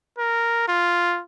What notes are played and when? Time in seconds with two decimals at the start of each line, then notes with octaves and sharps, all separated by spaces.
0.19 A#4
0.68 F4